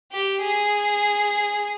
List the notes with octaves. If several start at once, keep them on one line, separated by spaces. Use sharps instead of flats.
G4
G#4